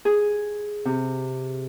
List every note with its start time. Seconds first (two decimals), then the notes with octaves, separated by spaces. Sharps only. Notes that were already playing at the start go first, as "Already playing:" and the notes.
0.05 G#4
0.85 C3